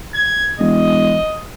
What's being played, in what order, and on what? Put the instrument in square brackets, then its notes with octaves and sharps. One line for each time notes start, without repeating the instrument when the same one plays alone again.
[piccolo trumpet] G#6
[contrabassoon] E1 [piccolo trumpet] D#5